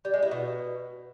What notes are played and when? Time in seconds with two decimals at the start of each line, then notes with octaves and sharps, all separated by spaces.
0.05 G3
0.14 G#3
0.22 E4
0.31 B2